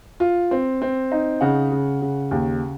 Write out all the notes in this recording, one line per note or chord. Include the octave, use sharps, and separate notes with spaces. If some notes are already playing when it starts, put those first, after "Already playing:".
F4
C4
C4
D#4
C#3 F#5
C#3
C#3
D#2